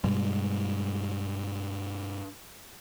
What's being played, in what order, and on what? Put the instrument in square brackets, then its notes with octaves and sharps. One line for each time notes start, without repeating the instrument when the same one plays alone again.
[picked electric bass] G2 B2 G3 G#3